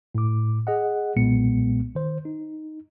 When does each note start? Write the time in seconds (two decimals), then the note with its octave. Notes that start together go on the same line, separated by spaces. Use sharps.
0.15 A2 D6
0.67 G#4 D#5 F#5
1.16 B1 A#2 G#3 B3 C#7
1.95 D#3 C5
2.25 D#4